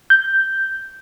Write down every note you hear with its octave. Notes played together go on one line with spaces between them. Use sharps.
G6